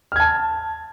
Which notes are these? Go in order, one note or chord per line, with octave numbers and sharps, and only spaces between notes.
A5 F6 G#6